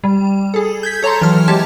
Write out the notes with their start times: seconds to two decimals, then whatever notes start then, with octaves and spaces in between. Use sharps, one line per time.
0.04 G3
0.54 G#4 A4
0.83 G6 G#6 B6
1.03 A4 C#5 A5 A#5 C6
1.21 E3 F#3 F6
1.48 G#3 G4 A5 G#6